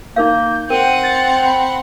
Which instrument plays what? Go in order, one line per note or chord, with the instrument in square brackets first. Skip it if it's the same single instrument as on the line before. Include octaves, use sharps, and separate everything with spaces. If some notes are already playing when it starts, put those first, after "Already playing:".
[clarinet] A#3 [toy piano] D#4 A#4 F5 [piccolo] G6
[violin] C4 F#5 [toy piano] A#4 [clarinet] G5 [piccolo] D#7
[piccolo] A6
B5